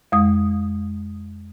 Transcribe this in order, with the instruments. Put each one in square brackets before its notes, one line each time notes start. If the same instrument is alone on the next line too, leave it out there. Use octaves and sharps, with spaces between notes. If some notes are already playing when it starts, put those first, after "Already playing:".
[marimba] F2 G#3 D#6